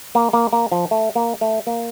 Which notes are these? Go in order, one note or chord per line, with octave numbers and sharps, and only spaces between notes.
A#3
A#3
A#3
F3
A3
A#3
A3
A#3